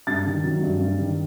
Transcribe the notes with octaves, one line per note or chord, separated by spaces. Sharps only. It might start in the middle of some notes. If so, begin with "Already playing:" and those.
G2 A6
D#3
F#3
G2
G2
D#3